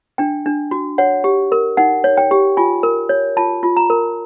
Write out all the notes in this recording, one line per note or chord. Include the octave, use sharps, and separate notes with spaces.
D4 G5
D4
F#4
C#5 F#5
G4
A#4
D#4 F#5
C#5
G5
G4
F4 G#5
A#4
C#5
F4 A5
F4
A#5
A#4